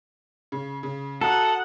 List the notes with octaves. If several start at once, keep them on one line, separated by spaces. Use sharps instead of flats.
C#3
C#3
F#4 A4 F#5 A#5 D#6